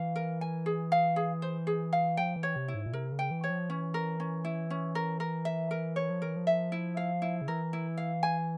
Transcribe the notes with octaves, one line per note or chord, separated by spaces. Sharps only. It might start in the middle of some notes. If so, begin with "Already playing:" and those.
Already playing: E3 F5
A#4
G#5
G#4
F5
G#4
C5
G#4
F5
F3 G5
E3
C#5
C3
E4
G#2
A#2
C3 A#4
C#3
G5
E3
C#5
F3
E3 C#4
A#4
C#4
E4
C#4
A#4
A#4
E5
A#4
C#5
F3
E3 A#4
F3
E5
E4
F5
E4
C#3
E3 A#4
E4
F5
G#5